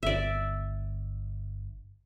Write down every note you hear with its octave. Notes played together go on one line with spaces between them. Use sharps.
G1 D5 E5